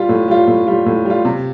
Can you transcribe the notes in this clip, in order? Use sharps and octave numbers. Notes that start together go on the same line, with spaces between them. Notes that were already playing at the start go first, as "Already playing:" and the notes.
Already playing: G3 F4
A2
G3 F4
A2
G3 F4
A2
G3 F4
C3